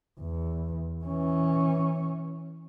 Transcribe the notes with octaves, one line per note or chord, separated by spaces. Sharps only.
E2
E3 C#4